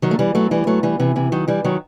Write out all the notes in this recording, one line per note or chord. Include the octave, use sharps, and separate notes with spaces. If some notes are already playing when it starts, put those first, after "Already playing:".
D#3 F#3
A3
E3 G3
F#3 A3
E3 G3
F#3 A3
E3 G3
C3 E3
C3 E3
D#3 F#3
E3 G3
D#3 F#3